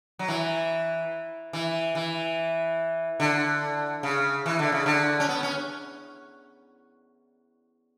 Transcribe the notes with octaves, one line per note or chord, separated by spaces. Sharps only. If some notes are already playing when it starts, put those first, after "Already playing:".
F#3
E3
E3
E3
D3
C#3
E3
D3
C#3
D3
C#4
B3
C#4